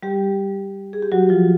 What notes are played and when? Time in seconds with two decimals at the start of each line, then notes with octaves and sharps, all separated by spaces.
0.03 G3 G4
0.93 G#4
1.02 G4
1.12 F#3 F#4
1.29 F3 F4